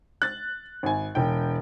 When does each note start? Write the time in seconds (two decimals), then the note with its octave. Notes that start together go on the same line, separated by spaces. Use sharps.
0.22 F#6 A6
0.83 G#1 G#5
1.15 E1 G5